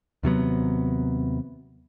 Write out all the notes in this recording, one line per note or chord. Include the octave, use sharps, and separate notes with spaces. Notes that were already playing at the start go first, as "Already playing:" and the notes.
D#2 C3 F#3 B3